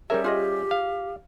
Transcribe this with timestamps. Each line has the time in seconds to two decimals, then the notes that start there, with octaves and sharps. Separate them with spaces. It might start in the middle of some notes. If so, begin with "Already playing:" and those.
0.10 G3 C#4 G4 G#4 A#4 C#5 E5
0.24 F4 G#4 D#5
0.71 F5